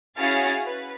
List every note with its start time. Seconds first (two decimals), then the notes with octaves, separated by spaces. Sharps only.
0.17 C#4 E4 F#4 G#4 F5 A6
0.66 B4